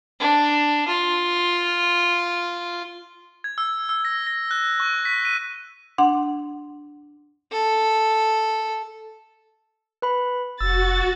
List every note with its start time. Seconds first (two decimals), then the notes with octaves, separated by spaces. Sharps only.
0.20 D4
0.88 F4
3.44 G#6
3.58 E6
3.89 E6
4.05 A#6
4.27 A#6
4.51 F#6
4.80 C#6
5.05 B6
5.25 D#7
5.98 D4 F#5 C6
7.52 A4
10.02 B4 B5
10.61 F1 F#4 E6 A6